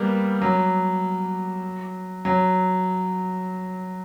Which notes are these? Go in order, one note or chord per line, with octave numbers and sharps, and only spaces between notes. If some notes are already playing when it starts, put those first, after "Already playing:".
Already playing: G3 A#3 B3
F#3
F#3